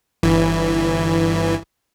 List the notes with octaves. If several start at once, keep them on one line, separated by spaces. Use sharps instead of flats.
G1 E3